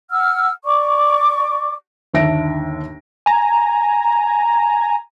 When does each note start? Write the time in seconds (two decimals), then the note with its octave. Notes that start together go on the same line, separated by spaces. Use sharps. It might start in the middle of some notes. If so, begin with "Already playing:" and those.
0.11 F#5 E6 F6
0.64 D5 C#6 D6
2.14 G1 D#2 D4 E5 A#6 D7
3.26 G#5 A#5